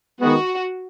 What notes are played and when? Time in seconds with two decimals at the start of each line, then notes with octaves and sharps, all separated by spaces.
0.20 D#3 G#3 B3 F#4